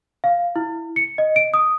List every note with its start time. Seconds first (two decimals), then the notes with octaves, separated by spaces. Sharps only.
0.24 F5
0.56 E4
0.96 C#7
1.18 D#5
1.36 D7
1.54 D#6